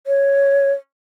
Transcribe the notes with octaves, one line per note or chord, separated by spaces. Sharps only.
C#5